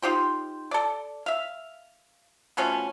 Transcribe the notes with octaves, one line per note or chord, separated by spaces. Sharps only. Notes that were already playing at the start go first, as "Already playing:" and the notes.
D#4 F4 G4 C5
A4 D5
E5 F5
B2 F3 A3 C#4